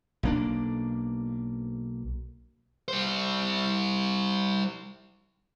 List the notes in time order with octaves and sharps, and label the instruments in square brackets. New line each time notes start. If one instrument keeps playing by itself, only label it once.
[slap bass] B1 A#3 D4
[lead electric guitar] G3 C5